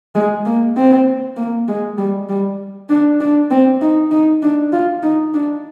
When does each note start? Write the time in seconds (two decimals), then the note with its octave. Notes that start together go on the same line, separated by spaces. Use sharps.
0.15 G#3
0.46 A#3
0.77 C4
1.37 A#3
1.68 G#3
1.98 G3
2.29 G3
2.89 D4
3.20 D4
3.51 C4
3.81 D#4
4.11 D#4
4.43 D4
4.73 F4
5.03 D#4
5.34 D4